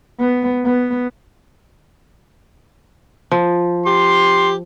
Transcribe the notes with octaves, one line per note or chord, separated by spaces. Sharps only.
B3
B3
F3
G4 C6